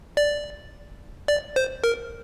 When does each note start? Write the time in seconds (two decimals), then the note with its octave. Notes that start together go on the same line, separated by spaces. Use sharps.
0.17 D5
1.28 D5
1.56 C5
1.84 A#4